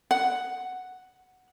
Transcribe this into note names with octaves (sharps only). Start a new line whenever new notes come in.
F#5